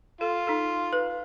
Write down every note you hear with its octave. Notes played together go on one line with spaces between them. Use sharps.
F4 A4
D#4 A4
B4